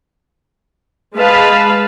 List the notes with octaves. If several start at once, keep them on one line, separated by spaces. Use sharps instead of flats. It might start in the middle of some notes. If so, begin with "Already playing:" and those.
G#3 B4 F5 A5 B5